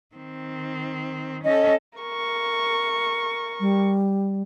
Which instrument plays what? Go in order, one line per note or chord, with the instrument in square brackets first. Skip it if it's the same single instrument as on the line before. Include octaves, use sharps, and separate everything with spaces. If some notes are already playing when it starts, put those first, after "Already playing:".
[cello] D#3 C4
[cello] C#4 A4 [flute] D#5
[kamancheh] A#4 C#6
[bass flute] G3